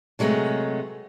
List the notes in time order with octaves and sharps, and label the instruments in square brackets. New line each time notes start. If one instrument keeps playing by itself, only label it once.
[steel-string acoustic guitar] C3 F#3 G#3 A3 B3